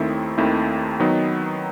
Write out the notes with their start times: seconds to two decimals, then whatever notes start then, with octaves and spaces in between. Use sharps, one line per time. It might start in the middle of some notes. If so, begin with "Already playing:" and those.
Already playing: D#2 D#3 A3 C4 E4
0.38 D#2 D#3 A3 C4 E4
1.00 D#3 F#3 B3 D#4